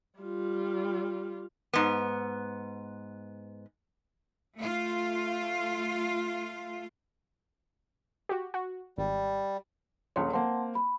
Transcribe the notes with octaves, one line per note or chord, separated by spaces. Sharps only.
G3 F4
G#2 B3
A3 F4
F#4 G4
F#4
G#1 G3
D#1 A#1 C#4 C6
A#3 C4 F#5 A5 C6
B5